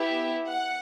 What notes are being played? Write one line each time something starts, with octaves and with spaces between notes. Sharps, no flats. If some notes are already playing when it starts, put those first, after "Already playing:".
Already playing: B3 E4 G4 E5
F#5